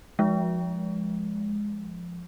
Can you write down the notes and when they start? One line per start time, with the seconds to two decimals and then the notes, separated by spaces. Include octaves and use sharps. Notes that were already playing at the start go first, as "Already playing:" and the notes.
0.19 F3 G#3